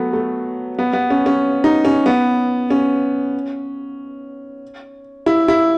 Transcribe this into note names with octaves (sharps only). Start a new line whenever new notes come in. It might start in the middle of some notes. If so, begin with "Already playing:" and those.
Already playing: F#3 A3 B3
A3
B3
B3
C#4
C#4
D#4
C#4
B3
C#4
E4
E4